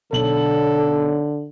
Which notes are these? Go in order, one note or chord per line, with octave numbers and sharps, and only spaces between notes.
B1 D3 A4 F#7